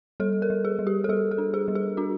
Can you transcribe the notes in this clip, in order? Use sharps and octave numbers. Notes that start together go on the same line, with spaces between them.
G3 A4
A#4
G3
G#4
G3
G4
A4
G3 G#4
A4
D4
G#4
G3
G#4
D4 F#4